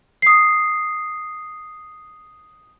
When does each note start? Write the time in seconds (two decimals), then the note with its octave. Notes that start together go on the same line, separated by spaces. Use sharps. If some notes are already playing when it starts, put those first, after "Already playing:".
0.22 D#6 C7